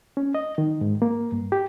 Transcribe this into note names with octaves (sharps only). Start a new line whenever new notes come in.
C#4
D#5
D#3
G#2
A#3
G2
G4